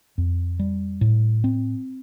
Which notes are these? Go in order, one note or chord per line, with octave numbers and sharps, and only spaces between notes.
F2
G3
A2
C4